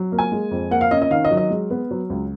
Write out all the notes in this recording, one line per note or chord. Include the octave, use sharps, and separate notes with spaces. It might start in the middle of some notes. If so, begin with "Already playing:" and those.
Already playing: F#3
A#3
G#5
G#3
F2
A#3 F#5
F5
C#4 D#5
D#5
D#3 F5
D#5
F#3
D#5
G#3
B3
F#3
C#2